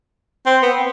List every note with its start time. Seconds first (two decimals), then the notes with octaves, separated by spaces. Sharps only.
0.46 C4
0.62 B3